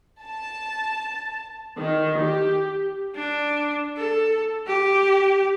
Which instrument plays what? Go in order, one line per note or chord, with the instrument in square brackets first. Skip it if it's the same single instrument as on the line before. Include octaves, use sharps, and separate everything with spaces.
[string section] A5
D#3
G4
[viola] D4
A4
G4